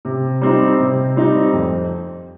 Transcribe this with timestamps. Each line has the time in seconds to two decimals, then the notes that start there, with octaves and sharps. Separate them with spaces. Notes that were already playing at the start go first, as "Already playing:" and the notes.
0.05 C3
0.41 G3 C4 D#4
0.79 C3
1.16 G3 C4 D#4
1.53 F2